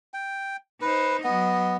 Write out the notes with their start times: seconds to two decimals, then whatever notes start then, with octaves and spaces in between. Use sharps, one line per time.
0.14 G5
0.81 D#4 B4 C5
1.24 F#3 B3 D#5